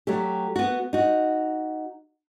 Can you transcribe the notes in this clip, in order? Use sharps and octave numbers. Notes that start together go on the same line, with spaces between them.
F#3 A3 G4
B3 F#4
D#4 F#4